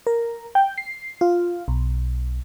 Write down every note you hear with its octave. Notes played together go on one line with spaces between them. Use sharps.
A#4
G5
C7
F4
B1